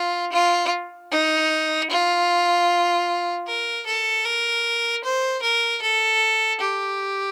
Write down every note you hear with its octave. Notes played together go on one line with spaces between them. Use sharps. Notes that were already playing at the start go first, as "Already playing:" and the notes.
Already playing: F4
F4
D#4
F4
A#4
A4
A#4
C5
A#4
A4
G4